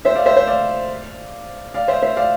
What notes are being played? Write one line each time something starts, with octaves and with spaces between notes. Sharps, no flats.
C5 E5
D5 F5
C5 E5
C5 E5
D5 F5
D5 F5
C5 E5
C5 E5
D5 F5